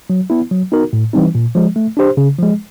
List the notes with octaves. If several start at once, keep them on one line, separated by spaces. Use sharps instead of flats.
F#3
B3 E4
F#3
B3 D#4 F#4 A#4
A2
E3 G3 C4 D#4
A#2
F3 G#3
A3
D4 G4 C5
C#3
F3 G#3